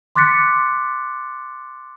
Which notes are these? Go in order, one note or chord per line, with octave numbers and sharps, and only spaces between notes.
C6 D6 F#6 A6 B6 C#7